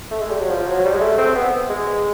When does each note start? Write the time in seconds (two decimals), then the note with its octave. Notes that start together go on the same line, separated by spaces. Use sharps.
0.11 A3
0.21 G#3
0.30 G3
0.40 F#3
0.49 F3
0.68 F#3
0.85 G3
0.93 G#3
1.01 A3
1.18 C4
1.35 B3
1.69 G#3
1.87 G#3